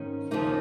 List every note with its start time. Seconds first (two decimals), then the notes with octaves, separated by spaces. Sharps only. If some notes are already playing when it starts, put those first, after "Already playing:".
Already playing: G#2 D#3 C#4
0.31 D#2 C#3 F3 A#3 D#4